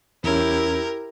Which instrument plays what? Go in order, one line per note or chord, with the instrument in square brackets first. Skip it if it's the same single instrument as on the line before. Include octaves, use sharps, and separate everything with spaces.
[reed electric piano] E2 C#4 [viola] E4 G4 [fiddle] A#4